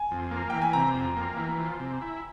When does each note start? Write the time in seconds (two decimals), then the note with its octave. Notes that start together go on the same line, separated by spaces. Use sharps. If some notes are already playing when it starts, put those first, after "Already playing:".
Already playing: G#5
0.11 F2
0.31 A#3
0.50 E3 G5
0.62 G#5
0.73 C3 A#5
0.95 F2
1.17 A#3
1.37 E3
1.58 F3
1.79 C3
2.01 E4